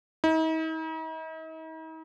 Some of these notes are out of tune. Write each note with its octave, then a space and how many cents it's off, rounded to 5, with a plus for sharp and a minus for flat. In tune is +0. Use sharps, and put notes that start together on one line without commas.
D#4 +45